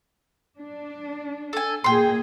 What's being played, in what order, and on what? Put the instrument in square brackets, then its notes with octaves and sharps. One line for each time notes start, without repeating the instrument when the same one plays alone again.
[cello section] D4
[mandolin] A4 G#5
[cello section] A#2 A#3 G#4 [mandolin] G5 C6